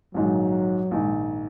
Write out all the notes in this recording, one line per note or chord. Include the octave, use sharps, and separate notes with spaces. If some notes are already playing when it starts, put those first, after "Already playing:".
A#1 G#2 D#3 F#3
A#1 G#2 D#3